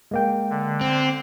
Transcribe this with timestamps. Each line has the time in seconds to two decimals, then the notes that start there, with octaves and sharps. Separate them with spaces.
0.11 G#3 A#3 G5
0.50 D3
0.81 C4